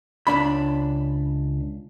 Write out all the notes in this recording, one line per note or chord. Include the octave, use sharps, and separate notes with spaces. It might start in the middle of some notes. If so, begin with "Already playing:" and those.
C#2 F#2 D4 B5